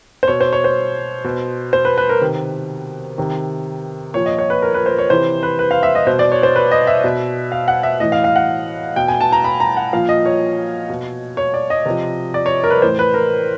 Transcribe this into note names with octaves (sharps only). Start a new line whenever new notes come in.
C5
B2 C#5
C5
C#5
C5
B2
C5
B4
B4
A#4
C3 D#3
C3 D#3
A#2 F3 C#5
D#5
C#5
B4
A#4
B4
C5
C#5
C3 E3 C5
B4
B4
F5
E5
D#5
B2 C5
D5
C#5
C5
B4
D#5
E5
B2
F5
F#5
E5
A2 E3 D#5
F5
F5
F#5
B2 G5
G#5
A5
A#5
B5
A#5
F#5
A#2 F3 F5
D#5
C#5
B2
C#5
D5
D#5
C3 F3
D5
C#5
A#4
B4
A2 E3 C5
B4
A#4